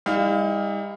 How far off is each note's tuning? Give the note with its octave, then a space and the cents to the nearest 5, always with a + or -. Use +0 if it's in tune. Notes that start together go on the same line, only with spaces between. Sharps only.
G3 +40 D#4 +40 F5 +0